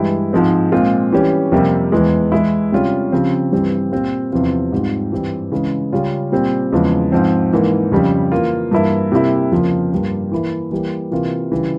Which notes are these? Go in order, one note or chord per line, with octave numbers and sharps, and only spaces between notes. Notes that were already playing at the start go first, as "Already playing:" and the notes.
Already playing: G2 E3 G#3 E4 G4
G#2 F3 G#3 C4
A#2 G#3 C4 F4
E3 G3 C#4 G4
F2 C3 G3 A#3
E2 E3 G#3
E3 G#3 E4
C3 G3 C#4 F4
C#3 F3 C4 G4
G2 E3 G3 C4
A#2 G3 C4 F4
E2 C3 F3 C4 F4
G#2 G3 C4 F4
G2 E3 G3 C4 G4
C#3 E3 G#3
C#3 G3 C#4 F4
A#2 G3 C4
E2 C#3 F3 G#3
G#2 F3 C4
G#2 E3 A#3
F2 C#3 G3
E3 A#3 F4
G2 E3 A#3 E4
C3 G3 A#3 E4
F2 C#3 F3 A#3 F4
G2 G3 A#3 F4
E3 A#3 E4
E3 G3 A#3
C3 E3 A#3 F4
C#3 E3 G3